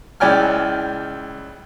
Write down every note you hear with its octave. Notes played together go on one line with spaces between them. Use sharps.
C#2 E4 D5 G5 G#5 F6